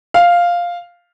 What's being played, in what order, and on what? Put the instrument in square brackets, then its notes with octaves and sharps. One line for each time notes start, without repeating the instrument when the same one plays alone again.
[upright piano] F5